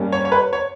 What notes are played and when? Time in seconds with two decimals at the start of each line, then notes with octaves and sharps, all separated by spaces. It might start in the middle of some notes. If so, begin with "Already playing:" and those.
Already playing: G2 G3 A#3 C#4
0.12 C#5
0.25 C#5
0.32 B4
0.53 C#5